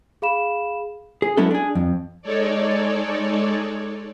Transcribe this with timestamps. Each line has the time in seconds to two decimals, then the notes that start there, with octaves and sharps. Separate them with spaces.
0.22 G#4 F5 B5 E7
1.22 G#4
1.37 F#3 G#3 B3 C#4 E4 A4
1.51 D4 G#4
1.75 F2
2.22 G#3 D#4 A4 C#5 D5